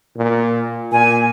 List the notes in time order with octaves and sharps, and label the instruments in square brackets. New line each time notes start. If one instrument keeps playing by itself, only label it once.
[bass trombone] A#2
[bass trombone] A#2 [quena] G#5